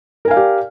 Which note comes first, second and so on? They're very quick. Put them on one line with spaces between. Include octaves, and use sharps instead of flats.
A#4 G#5 F5 D5 G4